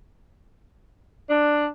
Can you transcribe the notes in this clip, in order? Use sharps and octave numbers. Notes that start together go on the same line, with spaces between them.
D4